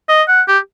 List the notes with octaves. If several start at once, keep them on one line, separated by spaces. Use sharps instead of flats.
D#5
F#5
G4